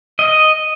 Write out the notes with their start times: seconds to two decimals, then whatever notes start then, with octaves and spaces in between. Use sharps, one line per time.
0.19 D#5